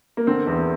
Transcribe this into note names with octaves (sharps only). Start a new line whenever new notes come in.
A#3
D3 C4
E2